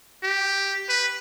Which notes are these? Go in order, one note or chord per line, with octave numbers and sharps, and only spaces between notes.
G4
B4